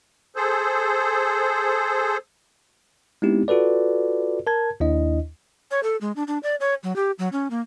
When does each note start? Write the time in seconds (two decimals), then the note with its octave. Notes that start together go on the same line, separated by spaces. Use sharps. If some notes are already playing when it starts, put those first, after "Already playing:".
0.36 G#4 A4 C5
3.22 G#3 B3 C4 D#4 E4 G4
3.48 F4 F#4 A4 B4 D5
4.47 A#4 A5 G#6
4.80 D#2 D4 E4 D#5
5.71 C#5
5.83 A4
6.01 G#3
6.16 D4
6.28 D4
6.43 D5
6.60 C#5
6.83 F#3
6.96 G4
7.19 F#3
7.32 C#4
7.51 A#3